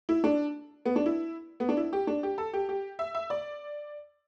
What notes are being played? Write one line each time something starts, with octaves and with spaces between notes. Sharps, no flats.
E4
D4
B3
D4
E4
B3
D4
E4
G4
D4
G4
A4
G4
G4
E5
E5
D5